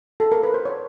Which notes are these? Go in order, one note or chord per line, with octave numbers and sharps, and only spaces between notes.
A4
A#4
B4
C5
C#5